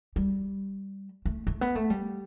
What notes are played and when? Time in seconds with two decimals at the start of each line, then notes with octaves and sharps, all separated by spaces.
0.16 G3
1.26 A3
1.47 A3
1.61 B3
1.75 A3
1.90 G3